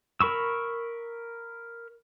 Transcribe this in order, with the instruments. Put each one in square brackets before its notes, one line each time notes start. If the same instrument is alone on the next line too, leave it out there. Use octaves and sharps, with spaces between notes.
[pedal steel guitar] A#4 B5 C#6 E6